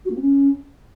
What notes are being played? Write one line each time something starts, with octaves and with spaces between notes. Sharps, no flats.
F#4
A#3
C4
C#4